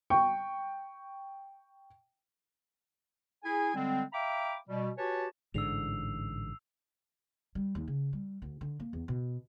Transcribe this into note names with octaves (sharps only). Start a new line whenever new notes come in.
G5 C#6
E4 G#4 G#5
D3 G3 G#3 C4
E5 F5 G5 A#5 B5 D6
B2 G3
F#4 G4 B4 C#5 G#5 A5
A1 G#2 D3 E6 C7 F7
G3
D#2
C#3
G3
D2
D3
A#3
E2
B2